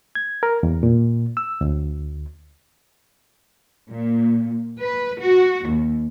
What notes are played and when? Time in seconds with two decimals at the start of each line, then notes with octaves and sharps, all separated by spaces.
0.15 G#6
0.43 A#4
0.63 E2
0.83 A#2
1.37 E6
1.61 D2
3.92 A#2
4.82 B4
5.21 F#4
5.67 D#2